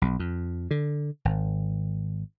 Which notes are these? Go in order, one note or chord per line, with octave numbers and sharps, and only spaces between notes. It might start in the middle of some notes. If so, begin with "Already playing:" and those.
B1
F2
D3
G#1